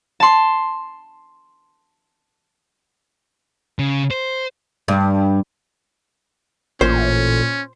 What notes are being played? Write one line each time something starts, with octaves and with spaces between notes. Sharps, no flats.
A5 C6
C#3
C5
G2
A1 A#2 C#4 C5